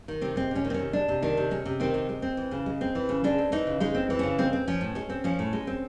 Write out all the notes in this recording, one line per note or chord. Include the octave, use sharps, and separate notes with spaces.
D#3
C3 C4
G#3 C4
C3 C#4
D#3
C4
C3 C#4
G#3 D4
C3
D#3 D4
C3
G#3 C#4
C3
D#3 C4
C3
G#3
C4
E3
C#3
G#3
C4
E3
C#3
G#3 D4
C4
E3 D#4
C#3
G#3 D#4
C4
E3
C#3 C#4
G#3 C4
C4
F3 C#4
A2
G#3 C#4
C4
F3 C#4
A2
G#3
C4